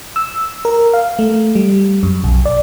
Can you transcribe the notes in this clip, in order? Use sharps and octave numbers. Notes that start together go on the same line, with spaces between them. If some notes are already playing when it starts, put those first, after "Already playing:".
E6
A#4
F5
A3
G3
F#2
B1
D5